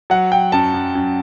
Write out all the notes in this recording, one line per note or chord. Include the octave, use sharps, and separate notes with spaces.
F#3 F#5
F#3 G5
F#2 A5
F#2
F#2